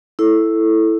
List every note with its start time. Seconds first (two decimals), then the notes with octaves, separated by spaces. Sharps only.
0.19 E4 A4